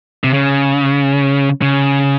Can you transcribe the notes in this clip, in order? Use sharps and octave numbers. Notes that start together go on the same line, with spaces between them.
C3
C#3
C#3